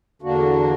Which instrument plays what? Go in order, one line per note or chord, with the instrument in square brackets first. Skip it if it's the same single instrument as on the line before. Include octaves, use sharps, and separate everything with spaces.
[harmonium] E2 D3 A#3 D4 F#4